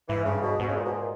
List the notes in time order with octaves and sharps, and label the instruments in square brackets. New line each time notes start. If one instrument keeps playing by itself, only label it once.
[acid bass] G#2 [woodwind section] E3
[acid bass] G2 [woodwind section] C#3
[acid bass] G#2 [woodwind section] B2
[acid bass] G#2 [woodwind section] B2
[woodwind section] C#3
A#2
B2
A#2